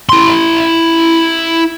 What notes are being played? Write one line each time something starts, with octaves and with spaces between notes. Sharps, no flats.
E4 C6